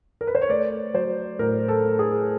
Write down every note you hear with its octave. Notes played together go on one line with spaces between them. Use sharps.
A#4
B4
C5
C#5
A3 D5
F#3 C5
A2 A#4
A4
A3
G#4